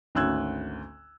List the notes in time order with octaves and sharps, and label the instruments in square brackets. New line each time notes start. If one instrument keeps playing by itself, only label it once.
[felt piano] G#1 D2 C#4 E6 F#6 G#6